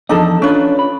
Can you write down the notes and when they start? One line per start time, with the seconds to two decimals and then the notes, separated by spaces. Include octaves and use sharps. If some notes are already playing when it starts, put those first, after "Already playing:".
0.09 E2 F3 D4 D#4 A4 D#5
0.42 C#4 D4 F4 B4
0.79 B5